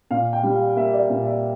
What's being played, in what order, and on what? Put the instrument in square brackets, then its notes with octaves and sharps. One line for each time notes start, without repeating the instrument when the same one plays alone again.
[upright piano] A#2 F5
G5
G3
F5
A#3 E5
D5
A#2
E5